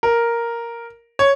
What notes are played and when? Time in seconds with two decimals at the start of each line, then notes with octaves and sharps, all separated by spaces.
0.03 A#4
1.19 C#5